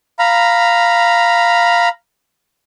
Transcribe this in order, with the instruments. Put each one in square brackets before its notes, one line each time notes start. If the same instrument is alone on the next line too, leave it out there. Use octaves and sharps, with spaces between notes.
[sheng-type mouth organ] F5 A#5 B5